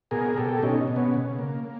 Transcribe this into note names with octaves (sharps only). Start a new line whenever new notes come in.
B2 G#4 A#4
B2 G4 A4
B2 C#4 D#4
B2
B3 C#4
C#3
A#3
A#3